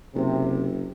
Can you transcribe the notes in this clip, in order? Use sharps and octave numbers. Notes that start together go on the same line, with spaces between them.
F#1 C3